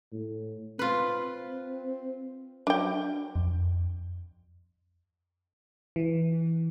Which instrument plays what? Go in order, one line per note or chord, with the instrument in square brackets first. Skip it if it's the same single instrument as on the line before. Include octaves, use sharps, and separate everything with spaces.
[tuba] A2
[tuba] C4 [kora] F4 B4
[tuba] F#3 [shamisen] D4 G5
[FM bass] F2
[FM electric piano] E3